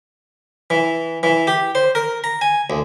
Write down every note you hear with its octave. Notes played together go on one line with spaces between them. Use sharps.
E3
E3
G4
C5
A#4
A#5
G#5
D2